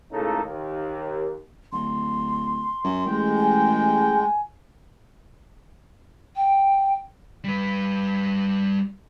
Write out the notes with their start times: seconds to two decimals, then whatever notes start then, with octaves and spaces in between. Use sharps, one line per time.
0.12 C#2 A2 C#3 A#3 D#4 A4
0.44 D#2
1.72 D1 C6
2.84 F#2
3.06 A1 G#3 G5
3.37 G#5
6.36 G5
7.44 G3 B4